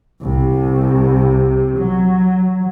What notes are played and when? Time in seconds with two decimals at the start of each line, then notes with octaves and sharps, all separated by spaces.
0.22 C2 C3
1.78 F#3